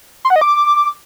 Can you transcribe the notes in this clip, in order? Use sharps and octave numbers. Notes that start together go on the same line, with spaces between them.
C6
F#5
D#5
D6